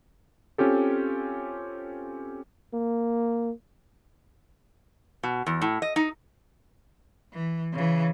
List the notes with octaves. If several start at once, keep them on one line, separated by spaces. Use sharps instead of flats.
C4 C#4 F4 G4 A4
A#3
B2
E2
A2
D#5
D#4
E3
C#3 E3